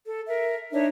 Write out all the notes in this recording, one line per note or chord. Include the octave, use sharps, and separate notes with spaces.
A4
A#4 E5
D4 D#4 C#5 E5